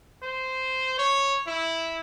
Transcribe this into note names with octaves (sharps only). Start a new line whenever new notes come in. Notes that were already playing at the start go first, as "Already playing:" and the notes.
C5
C#5
E4